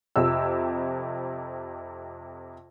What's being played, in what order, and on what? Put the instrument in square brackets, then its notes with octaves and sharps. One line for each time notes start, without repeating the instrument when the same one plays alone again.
[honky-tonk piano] F2 C3 E6